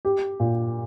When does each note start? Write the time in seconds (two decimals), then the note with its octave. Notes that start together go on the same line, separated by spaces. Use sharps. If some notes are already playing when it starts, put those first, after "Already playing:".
0.05 G4
0.40 A#2